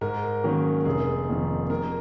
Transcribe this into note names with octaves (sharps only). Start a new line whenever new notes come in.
G#2 A#4
D#3 F#3 A#3 C#4
F1 G#4
F2 D#3 A#3
F2 A#4